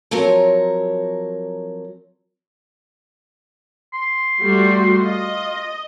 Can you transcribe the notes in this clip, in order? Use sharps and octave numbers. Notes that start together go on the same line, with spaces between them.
F3 F#3 C4 A#4 C#5
C6
G3 A3 F#4
F4 D#5